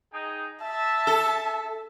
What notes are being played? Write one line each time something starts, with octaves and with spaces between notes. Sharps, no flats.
D#4 G#4 G5
E5 A5
A4